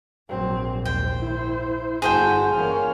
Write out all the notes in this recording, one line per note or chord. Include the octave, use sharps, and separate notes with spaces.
A#1 G#2 F#3 C4
D#2 C5 G5
E4
G1 F#4 G#4 C5 G5 A5
E3 A#3 C#4 F6